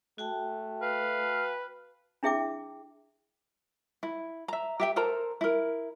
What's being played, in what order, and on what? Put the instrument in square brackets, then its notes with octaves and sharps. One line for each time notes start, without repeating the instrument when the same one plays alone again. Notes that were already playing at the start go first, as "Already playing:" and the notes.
[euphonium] A3 [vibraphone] F#4 G5 A5
[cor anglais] B4 [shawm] F5
[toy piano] D4 E4 G#4 E5 G5 D6
[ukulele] E4
E5 A#5
G4 E5 G5
A4 A#4 C5 A#5
E4 A#4